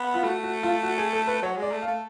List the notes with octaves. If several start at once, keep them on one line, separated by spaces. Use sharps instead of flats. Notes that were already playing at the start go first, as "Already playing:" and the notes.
Already playing: B3
F4
A3 F#4
F#4
F4
F#4
G#4
A4
B4
F#3 C#5
G#3
D5
A3
F5
A3